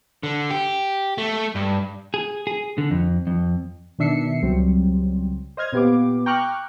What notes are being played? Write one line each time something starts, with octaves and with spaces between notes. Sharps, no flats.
D3
G4
A3
G2
G#4
G#4
D3
F2
F2
B2 D#3 D4 E5 C7 C#7
C#2 F#3 G3 C4
C5 D#5 F6 G#6
A#2 B3 G4 F5 D6
G5 A#5 C#6 D6 F6 F#6